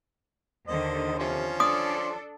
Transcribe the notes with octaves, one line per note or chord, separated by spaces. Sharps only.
D#2 D3 D#3 C5 D#5
C3 F3 C#4 C6
D4 A4 D5 D#6